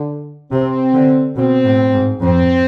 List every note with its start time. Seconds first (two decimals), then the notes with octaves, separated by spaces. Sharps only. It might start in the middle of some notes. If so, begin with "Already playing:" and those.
Already playing: D3
0.52 C3 C4
0.94 D3
1.36 B2 C4
1.65 A2
1.93 G#2
2.21 F2 C4